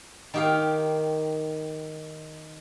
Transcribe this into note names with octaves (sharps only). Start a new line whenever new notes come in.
D#3 G4 F5